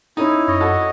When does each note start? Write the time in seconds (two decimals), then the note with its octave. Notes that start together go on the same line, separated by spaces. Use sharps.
0.17 C#4 D#4 E4
0.48 F#2 C#5 D#5
0.61 F#4 A4